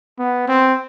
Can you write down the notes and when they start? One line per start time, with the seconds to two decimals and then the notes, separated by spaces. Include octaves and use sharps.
0.19 B3
0.48 C4